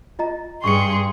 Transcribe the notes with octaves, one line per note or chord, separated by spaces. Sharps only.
F4 D#5 A#5
G2 G#4 C6 C#6 C#7